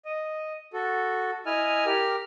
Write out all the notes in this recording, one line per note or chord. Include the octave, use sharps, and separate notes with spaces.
D#5
F#4 A4
E4 D#5 G#5 F6
G4 A#4 F6